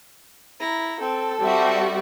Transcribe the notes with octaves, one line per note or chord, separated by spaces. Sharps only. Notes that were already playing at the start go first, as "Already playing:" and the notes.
E4 A#5
C4 A4 A5
G3 C4 F#4 E5